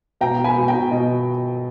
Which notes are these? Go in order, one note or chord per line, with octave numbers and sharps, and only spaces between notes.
B2 G5 A#5
B2
G#5 B5
B2
G5 A#5
B2
B2 D#5